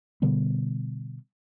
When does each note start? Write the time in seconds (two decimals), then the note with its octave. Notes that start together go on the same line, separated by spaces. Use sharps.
0.22 B2 D3 G3 B3